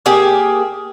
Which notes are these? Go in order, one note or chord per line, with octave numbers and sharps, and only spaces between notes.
A#3 G4 G#4